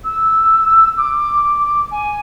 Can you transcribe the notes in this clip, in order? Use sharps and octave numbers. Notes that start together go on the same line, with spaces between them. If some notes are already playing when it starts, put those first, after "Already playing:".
E6
D6
G#5